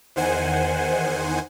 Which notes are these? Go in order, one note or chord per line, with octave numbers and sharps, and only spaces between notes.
E2 D#3 C5 F#5 G#5